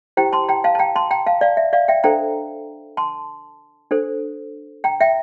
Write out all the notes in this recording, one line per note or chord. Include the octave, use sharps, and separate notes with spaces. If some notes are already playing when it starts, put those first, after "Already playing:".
E4 G4 C5 G5 A#5
A5 C6
G5 A#5
F5 A5
A5
G5 A#5
A5 C6
G5 A#5
F5 A5
D5 F5
E5
D5 F5
E5 G5
D4 A4 C5 G5 A#5
A5 C6
D4 A4 C5
G5 A#5
E5 G5